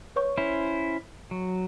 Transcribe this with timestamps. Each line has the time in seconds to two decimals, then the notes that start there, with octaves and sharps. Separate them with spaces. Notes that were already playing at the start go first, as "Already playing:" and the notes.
0.16 B4 C#5 C#6
0.38 C#4 E4 C5
1.31 F#3